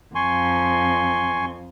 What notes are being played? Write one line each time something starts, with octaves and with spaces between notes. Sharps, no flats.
F2 G#5 C6 C#6